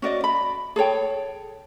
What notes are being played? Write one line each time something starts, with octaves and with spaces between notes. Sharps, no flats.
C#4 F#4 D5 D#5
B5
G#4 A4 C#5 G5